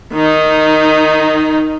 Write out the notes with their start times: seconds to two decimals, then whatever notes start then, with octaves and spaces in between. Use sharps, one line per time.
0.13 D#3 D#4